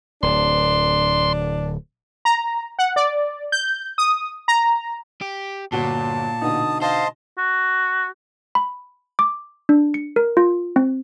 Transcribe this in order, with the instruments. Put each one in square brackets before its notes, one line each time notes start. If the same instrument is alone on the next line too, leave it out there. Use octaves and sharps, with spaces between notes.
[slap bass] D1 [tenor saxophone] D4 [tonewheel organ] C6
[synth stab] A#5
F#5
D5
G6
D#6
A#5
[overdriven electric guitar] G4
[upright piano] G1 F#4 G7 [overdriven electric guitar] A#2 [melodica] A5
[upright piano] B2 D3 D#4 [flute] D#6
[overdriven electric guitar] C5 [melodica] D#5 A5 C6 [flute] F5
[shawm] F#4
[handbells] B5
D6
D4
C#7
A#4
F4
C4